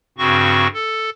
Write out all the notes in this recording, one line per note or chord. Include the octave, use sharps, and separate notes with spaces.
G2 C#3 C4 F#4 C#6
A4